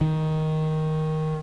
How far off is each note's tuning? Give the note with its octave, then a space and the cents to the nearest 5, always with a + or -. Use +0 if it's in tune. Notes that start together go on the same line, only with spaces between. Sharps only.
D#3 +10